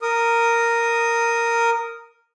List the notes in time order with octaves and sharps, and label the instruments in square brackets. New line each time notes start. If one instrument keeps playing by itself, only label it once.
[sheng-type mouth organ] A#4 D#6